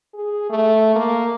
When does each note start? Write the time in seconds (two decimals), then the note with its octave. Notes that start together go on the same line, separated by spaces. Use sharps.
0.14 G#4
0.50 A3
0.95 A#3